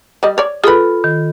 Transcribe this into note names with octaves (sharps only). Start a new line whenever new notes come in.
G3 D#5
C#5 D5
F4 G#4 A4 B4 B5
D#3